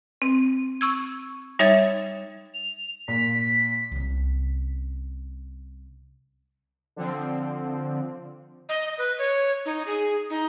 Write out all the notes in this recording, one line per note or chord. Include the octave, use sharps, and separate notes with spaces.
C4
C#6 E6 G#6
G3 D#4 C#5 E5 G#6 A6
F7
A#2 B6
B6
C2 C#4
D3 F3 C4
D#5
B4
C#5
D#4
G#4
D#4